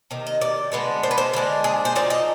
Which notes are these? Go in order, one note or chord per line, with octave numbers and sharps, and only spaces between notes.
C3 D#3
D#5
D5
D3 G#3 B3 D4
C5
B4
C5
D3 G#3 D4
G#4
C5
F3 C4 D#4 D5
D#5